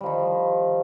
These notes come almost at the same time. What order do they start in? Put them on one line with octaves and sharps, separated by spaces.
G3 F3 D#3